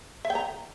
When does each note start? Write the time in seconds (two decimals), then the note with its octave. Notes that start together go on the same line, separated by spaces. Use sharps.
0.25 E5
0.30 G5
0.35 A#5